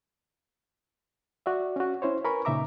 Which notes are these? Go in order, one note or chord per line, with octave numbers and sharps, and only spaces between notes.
F#4 D5 E5
C#4 F#4
C#4 E4 C5 C#5
A#4 B4 G#5 B5 C#6
A#2 C#3 D#4 E5 A#5 D6